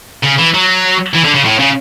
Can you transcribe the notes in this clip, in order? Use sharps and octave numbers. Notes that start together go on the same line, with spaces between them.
C#3
E3
F#3
E3
D3
C#3
A2
C#3